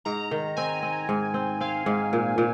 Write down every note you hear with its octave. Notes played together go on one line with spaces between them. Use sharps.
G#2 A#5
D#3
C4 G#5
C4
G#2
C4
C4 F5
G#2
A#2
A#2